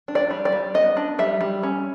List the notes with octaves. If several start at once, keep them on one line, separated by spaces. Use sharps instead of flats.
D4
D5
G3
D5
G3
B3 D#5
D4
G3 E5
G3
C#4